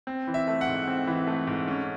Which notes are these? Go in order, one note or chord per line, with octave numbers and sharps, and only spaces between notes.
C4
E3
E5
A3
F#5
G#2
C4
E3
A3
G#2
C#4